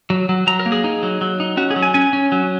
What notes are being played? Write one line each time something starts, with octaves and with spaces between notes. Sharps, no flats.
F#3
F#3
F#3 A#5
A#4
A#3
G#4
D#4
F#3
F#3
D#4
C#4 F#4
G#4
F#3
G#5
C#4 G#5
C#4
F#3